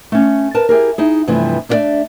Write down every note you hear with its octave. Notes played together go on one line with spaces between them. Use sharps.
A3 C#4
A#4 B4 A5
E4 G4 G#4 A#4
D#4 E4 G#4
G2 C3 E3 F3 A3
A3 D4 F4 C#5 D5 E5